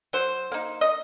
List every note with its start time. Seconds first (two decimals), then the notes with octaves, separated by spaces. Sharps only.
0.13 F#3 C5
0.52 A#3 D#4
0.81 D#5